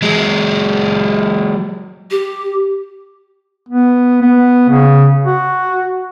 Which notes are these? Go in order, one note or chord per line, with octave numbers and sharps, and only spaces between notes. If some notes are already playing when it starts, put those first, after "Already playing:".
F#3 G#3
G4
B3
B3
C#3
F#4